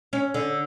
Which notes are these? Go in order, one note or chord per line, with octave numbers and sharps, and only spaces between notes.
C#4
D3